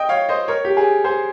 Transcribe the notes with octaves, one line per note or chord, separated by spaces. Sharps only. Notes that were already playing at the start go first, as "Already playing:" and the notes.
Already playing: D#5 G5
C#5 F5
C5 D#5
A#4 C#5
G4
G#4
G#4 C5